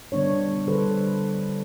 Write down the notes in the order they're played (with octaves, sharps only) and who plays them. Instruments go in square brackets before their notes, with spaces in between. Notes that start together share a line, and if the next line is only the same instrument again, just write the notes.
[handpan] D3 G3 B3 D4 C#5
D3 G3 A4 B4 C5